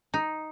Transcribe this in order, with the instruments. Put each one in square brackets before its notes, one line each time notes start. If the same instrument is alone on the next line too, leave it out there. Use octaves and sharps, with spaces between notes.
[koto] D#4